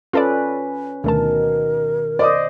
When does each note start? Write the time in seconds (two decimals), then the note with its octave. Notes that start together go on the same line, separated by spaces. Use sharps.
0.13 C#4 F4 A4 B4 D5
1.04 D2 B2 D#3 A3 A#4 A5
2.19 C5 D5 D#5 D6 D#6